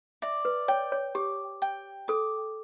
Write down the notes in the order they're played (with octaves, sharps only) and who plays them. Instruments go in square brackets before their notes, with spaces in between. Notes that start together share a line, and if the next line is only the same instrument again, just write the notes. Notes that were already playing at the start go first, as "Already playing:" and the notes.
[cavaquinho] D5 [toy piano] E5
[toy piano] B4
[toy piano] C#5 [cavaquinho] G5
[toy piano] C#5
[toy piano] G4 [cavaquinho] D6
[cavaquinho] G5
[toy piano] A4 [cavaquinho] D6